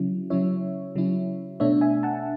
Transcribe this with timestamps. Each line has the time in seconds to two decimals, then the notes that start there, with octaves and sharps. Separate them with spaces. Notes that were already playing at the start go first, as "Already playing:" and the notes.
Already playing: C#3 F#3 C#4 E4
0.30 C#3 F#3 C#4 E4 C#5 E5
0.95 C#3 F#3 C#4 E4
1.60 B2 A3 D4 C#5 E5
1.81 E5 G#5
2.03 F#5 A5